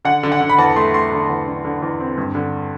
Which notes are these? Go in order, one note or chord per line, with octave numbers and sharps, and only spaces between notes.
D3 F#5
D3
F#5
D3
B5
E2 A5
A3 C6
A3 C6
D3
E2
D3
D3
E2
C4
G2
D3